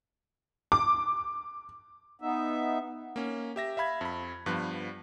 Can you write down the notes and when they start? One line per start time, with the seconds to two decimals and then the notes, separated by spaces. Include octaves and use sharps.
0.72 D6
2.22 B3 D#4 E5
3.16 A#3 C#4
3.56 G4 E5 A#6
3.77 E5 F5 B5 G#6
4.01 F2 B5
4.46 G2 F3 B3 F#6